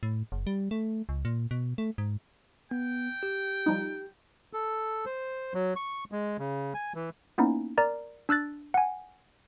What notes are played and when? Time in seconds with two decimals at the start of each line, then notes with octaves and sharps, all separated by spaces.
0.03 A2
0.32 F#1
0.47 G3
0.71 A3
1.09 C#2
1.25 A#2
1.51 B2
1.78 A3
1.98 G#2
2.71 B3 G5
3.23 G4
3.66 F3 G3 D#4
4.53 A4
5.06 C5
5.54 F#3
5.76 C#6
6.12 G#3
6.39 C#3
6.74 G#5
6.95 E3
7.38 A#3 B3 C#4 D#4 E4
7.78 A#4 D5 A#5
8.29 D4 E6 F#6 A6
8.74 F#5 G#5